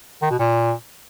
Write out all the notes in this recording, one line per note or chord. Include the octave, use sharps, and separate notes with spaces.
D#3
B2
A#2